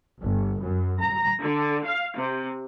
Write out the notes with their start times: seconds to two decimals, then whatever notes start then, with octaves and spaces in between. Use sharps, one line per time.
0.21 G1
0.61 F#2
1.00 A#5
1.42 D3
1.86 F5
2.18 C3